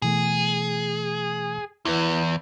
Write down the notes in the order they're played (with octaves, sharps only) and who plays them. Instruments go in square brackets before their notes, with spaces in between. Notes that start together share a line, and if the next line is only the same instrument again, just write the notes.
[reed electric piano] B2 E3 A3 [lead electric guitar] G#4
[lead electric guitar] E2 [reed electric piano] E4 B4